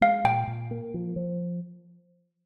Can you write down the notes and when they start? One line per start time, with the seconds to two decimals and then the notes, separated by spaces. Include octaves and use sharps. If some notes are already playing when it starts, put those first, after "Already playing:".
0.01 G#3 F5
0.24 A#2 G5
0.47 A#2
0.71 A#3
0.94 F3
1.16 F3